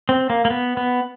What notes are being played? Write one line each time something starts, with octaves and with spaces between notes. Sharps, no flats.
C4
A#3
A#3
B3
B3